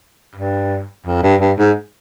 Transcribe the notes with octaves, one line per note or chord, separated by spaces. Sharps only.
G2
F2
G2
G2
G#2